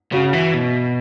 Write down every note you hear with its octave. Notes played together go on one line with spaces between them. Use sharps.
C#3 F#4
E3
B2